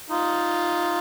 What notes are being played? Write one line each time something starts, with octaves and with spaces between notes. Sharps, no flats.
D#4 F4